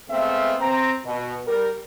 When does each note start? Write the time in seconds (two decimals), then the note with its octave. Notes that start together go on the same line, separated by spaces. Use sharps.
0.10 G#3 A3 B3 C4 E5 F5
0.61 C4 A#5
1.06 B2
1.47 G3 A#4